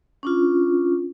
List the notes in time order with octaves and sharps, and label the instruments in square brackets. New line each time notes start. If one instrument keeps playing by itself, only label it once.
[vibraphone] C#4 D4 F4